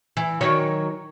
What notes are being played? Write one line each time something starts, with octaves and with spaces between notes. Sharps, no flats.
E3
D#3 F#3 C#5